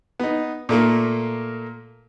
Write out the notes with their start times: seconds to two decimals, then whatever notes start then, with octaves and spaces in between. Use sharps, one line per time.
0.20 B3 D#4
0.69 A#2 A3 A#3